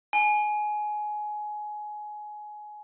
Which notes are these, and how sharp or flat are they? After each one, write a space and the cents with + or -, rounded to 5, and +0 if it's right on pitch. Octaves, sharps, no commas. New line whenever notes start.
G#5 +20